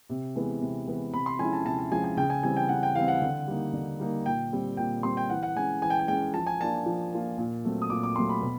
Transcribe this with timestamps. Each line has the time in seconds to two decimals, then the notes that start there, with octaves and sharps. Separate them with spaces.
0.10 C3
0.36 E3 G#3 B3
0.61 C3
0.87 E3 G#3 B3
1.13 C3 B5
1.26 C6
1.39 F3 G#3 C#4 E4 G#5
1.53 A5
1.65 C3 A5
1.79 A5
1.91 F3 G#3 C#4 E4 G#5
2.04 G#5
2.17 C#3 G5
2.30 G#5
2.43 E3 G3 C4 G#5
2.57 G5
2.69 C#3 F#5
2.83 G5
2.95 E3 G3 C4 F5
3.08 F#5
3.22 D3
3.48 G3 A#3 D#4
3.73 D3
4.00 G3 A#3 D#4
4.26 A#2 G5
4.52 G3 C4
4.77 A#2 G5
5.03 G3 C4 C6
5.17 G5
5.30 E3 F#5
5.43 F#5
5.56 G#3 C#4 G#5
5.82 E3 G#5
5.90 G5
5.99 G#5
6.08 G#3 C#4 G5
6.34 F3 A5
6.47 G#5
6.60 A#3 D4 F4 A5
6.86 F3
7.13 A#3 D4 F4
7.38 A#2
7.64 F#3 A3 C4
7.82 D#6
7.90 A#2 D6
8.03 D6
8.16 F#3 A3 C4 C6
8.29 B5
8.42 B2